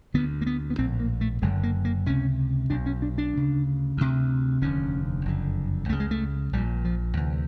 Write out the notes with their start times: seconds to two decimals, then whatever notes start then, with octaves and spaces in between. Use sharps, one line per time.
0.14 D2 D3 B3
0.41 A#3
0.46 B3
0.70 B3
0.78 A#1 A2 C4
1.00 A#3
1.21 A3
1.42 F#1 F#2 D3 G#3
1.63 A#3
1.85 A#3
2.06 C#2 C3 C#4
2.70 B1 B2 D4
2.86 C#4
3.02 D4
3.18 D4
3.34 D2 C#3
3.97 D2 C3
4.61 F1 D#2 D3 C#4
5.25 F#1 F2 D3
5.89 C#2 C#3 A3
6.00 G#3
6.11 A3
6.53 A#1 A#2 G3
6.85 F3
7.17 D2 C3 E3